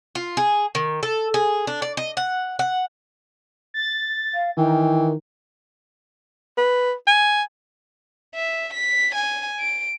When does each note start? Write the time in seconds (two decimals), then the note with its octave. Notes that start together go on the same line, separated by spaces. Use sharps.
0.15 F4
0.37 G#4
0.75 D#3
1.03 A4
1.34 G#4
1.67 D4
1.82 D5
1.97 D#5
2.17 F#5
2.59 F#5
3.74 A6
4.34 F5
4.57 D#3 E3 G5
6.57 B4
7.07 G#5
8.35 E5
8.74 B6
9.15 G#5
9.60 D7